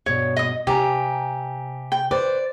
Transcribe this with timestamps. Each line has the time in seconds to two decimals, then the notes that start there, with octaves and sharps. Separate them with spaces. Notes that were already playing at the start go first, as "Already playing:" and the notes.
0.06 G2 B2 C#5
0.36 D#5 D#6
0.67 C3 G4 G#5 A#5
1.92 G5
2.11 B4 C5 D5